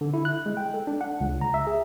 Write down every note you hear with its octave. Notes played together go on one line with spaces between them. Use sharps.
D3
E4
F#6
G#3
G5
A4
D4
F#5
C#2
A#5
E5
G#4